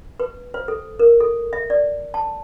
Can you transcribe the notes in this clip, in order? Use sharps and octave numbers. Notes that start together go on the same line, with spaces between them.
B4
C5
A4
A#4
A4
E5
D5
A5